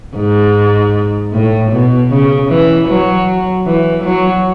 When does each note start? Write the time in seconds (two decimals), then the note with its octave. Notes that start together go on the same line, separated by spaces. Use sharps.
0.16 G#2
1.33 A2
1.72 B2
2.11 C#3
2.49 E3
2.88 F#3
3.66 E3
4.04 F#3